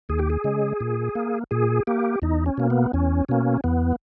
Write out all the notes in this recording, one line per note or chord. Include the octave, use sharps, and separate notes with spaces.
D#2 G#4
G4
G#4
C#3 G#3
A#2
A#3
A#2 G#4
A#3 G4
E2 D#4
C#4
B2 A#3
B3
E2 C#4
B2 A#3 C#4
E2 B3